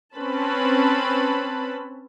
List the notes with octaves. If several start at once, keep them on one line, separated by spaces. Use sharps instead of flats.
C4 C#4 B4 A5 B5